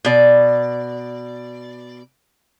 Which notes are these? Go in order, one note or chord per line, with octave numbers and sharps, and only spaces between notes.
B2 D5